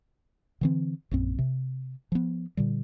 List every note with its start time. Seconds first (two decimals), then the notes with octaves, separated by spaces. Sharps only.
0.61 D3 E3 C4
1.11 A#1 F#2 C4
1.39 C3
2.12 F3 B3
2.57 A#2 D3 G3